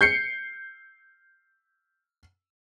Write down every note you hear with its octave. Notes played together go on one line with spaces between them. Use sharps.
G6 C7 C#7